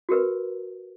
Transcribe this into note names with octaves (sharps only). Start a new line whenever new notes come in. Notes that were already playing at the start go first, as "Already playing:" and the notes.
F#4 G4 A#4 B4